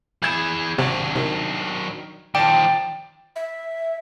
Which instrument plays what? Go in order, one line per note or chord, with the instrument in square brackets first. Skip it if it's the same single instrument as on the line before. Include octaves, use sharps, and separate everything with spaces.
[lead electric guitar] E3 G#4 [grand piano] G6 G#6 E7
[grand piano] G#1 [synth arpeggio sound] C3 [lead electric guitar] F#3 D4
[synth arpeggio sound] C3 [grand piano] D#3
[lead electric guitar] D#3 F3 [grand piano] D5 A5 [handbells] G5
[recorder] E5